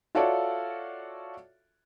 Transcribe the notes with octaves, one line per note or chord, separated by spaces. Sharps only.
F4 F#4 A4 C#5 D5 E5